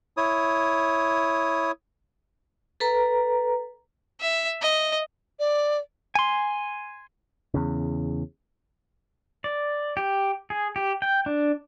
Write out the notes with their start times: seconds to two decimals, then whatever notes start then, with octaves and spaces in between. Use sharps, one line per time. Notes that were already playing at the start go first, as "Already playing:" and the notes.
0.17 E4 C#5 D#6
2.80 A4 B4 A#5
4.21 E5
4.61 D#5
5.39 D5
6.15 G#5 C6
7.54 E2 C#3
9.44 D5
9.97 G4
10.50 G#4
10.76 G4
11.02 G5
11.26 D4